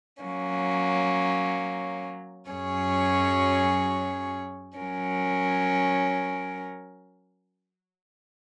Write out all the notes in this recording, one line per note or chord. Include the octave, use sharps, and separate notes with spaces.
F#3 A#3 C#4
F#2 F#3 C#4 G#4 C#5
F#3 C#4 A#4